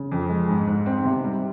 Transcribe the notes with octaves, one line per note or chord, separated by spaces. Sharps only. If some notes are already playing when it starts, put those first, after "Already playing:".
Already playing: C#3
F2
G#3
G#2
G#2
C4
C3
G3